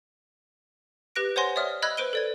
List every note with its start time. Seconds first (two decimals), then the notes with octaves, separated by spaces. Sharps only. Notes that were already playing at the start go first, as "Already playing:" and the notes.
1.16 G4 B4 F#6 A#6 D7
1.36 C5 C#5 F#5 G#5 C6 A#6
1.56 C#5 D5 E5 D#6 F6
1.82 D#5 B5 E6 F#6 G#6
1.97 B4 C5 F#6 D7 D#7 G7
2.13 A4 D5 G#6